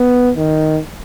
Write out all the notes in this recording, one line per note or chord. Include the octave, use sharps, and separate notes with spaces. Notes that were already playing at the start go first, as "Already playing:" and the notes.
Already playing: B3
D#3